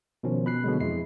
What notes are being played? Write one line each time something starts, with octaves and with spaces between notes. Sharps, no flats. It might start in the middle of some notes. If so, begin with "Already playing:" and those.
B2 D#3 F3 C#4
B2 B5 F#6 C7
B2 D3 F#3 G#3
F2 G#3 E4 C7